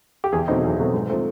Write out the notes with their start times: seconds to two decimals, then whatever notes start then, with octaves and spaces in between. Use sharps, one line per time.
0.24 G4
0.32 E2 G#4
0.48 B2 F#3 A3 C4 D#4
0.64 E2
0.78 B2 F#3 A3 C4
0.94 G#2
1.09 F3 A3 C4